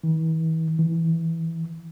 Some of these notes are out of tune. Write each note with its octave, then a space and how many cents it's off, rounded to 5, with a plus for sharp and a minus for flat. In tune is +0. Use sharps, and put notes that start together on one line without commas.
E3 -40
E3 -5